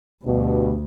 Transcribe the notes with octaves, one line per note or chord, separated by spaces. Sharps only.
D2 G2 B2